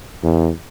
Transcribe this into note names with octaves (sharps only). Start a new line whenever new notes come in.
E2